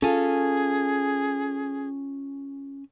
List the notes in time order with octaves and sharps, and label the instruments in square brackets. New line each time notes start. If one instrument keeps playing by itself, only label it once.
[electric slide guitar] C#4 G#5 [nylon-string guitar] F4 A4 [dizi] G#4